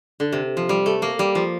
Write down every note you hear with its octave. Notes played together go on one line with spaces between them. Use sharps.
D3
C3
F3
G3
A3
A#3
G3
F3